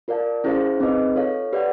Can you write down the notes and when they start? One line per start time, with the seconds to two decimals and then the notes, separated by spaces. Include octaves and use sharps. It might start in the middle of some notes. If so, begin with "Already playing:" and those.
0.08 F4 A#4 D5 F5 A5
0.44 C#4 E4 G#4 C5 F5
0.80 C4 D#4 G#4 B4 D#5
1.15 F4 A4 C#5 F5
1.53 G4 B4 D5 F#5